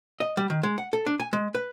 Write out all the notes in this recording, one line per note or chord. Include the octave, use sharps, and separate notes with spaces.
D#5
G3
D#3
G#3
F#5
A4
D4
G#5
G#3
B4